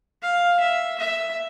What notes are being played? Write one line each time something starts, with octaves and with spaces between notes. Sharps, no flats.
F5
E5
E5